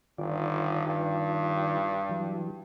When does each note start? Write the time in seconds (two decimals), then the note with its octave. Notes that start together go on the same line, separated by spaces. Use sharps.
0.18 G1 D#3 F4 D5
0.87 G2
2.09 E3 F#3